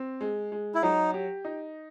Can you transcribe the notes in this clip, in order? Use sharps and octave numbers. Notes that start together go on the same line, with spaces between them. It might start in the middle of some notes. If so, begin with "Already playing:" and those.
Already playing: C4
G#3
G#3
E4
F#3 D#4
G4
D#4